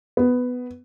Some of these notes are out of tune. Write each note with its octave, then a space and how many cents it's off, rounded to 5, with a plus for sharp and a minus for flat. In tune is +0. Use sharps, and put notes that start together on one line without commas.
B3 +10